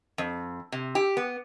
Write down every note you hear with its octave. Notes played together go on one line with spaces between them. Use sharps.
F2
C3
G4
B3